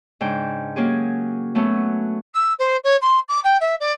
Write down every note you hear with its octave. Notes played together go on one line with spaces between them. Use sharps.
G#2 C#3 D4 G5
F#3 A#3 C#4 G4 G#4
F#3 A3 B3 C#4
E6
C5
C#5
C6
D6
G5
E5
D5